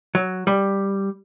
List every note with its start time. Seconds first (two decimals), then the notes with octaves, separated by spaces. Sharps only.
0.15 F#3
0.47 G3